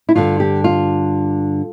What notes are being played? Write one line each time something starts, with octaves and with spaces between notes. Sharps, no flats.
E4
G2 D3 F4
G4
F4